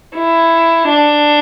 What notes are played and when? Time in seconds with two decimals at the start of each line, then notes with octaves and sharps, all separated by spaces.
0.15 E4
0.88 D4